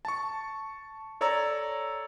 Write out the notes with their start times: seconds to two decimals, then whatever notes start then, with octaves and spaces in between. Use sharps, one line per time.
0.05 A5 C#6
1.21 A4 C#5 D5 A#5 E6